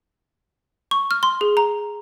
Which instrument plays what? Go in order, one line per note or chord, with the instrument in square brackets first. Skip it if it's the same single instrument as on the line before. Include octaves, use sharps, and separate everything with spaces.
[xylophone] C#6
F6
C6
G#4
A#5